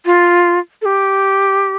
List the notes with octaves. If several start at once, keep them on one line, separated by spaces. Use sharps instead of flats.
F4
A4
G4